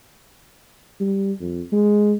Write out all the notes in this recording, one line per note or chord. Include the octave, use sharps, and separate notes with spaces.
G3
F2
G#3